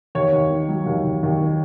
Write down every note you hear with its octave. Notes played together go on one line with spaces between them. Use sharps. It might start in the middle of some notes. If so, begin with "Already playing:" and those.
D#2 C#5
D#2
D#3
F#3
D#2
D#2
D#2
D#3